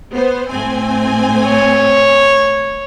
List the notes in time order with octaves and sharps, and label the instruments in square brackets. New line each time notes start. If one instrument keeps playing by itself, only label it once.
[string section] B3 C5
A2 C4 G#5
[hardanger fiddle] C#5